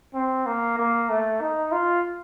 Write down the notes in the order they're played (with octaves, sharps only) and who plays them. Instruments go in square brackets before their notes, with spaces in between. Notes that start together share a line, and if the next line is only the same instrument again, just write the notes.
[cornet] C4
A#3
A#3
A3
D#4
F4